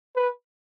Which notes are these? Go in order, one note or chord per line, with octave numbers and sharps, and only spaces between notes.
B4